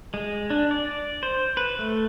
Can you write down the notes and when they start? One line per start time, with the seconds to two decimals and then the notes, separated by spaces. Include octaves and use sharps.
0.14 G#3
0.50 D4
0.71 D5
1.23 C5
1.57 B4
1.79 A3